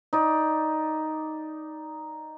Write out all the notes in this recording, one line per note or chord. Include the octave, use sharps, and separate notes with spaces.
D#4 D5